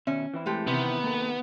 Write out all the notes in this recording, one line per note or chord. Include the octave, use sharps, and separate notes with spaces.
B2 D#3 C#4 E5
E3 C4 E4
G#3 A3 G4
C3 D#3 B3
A#3 A4 A#4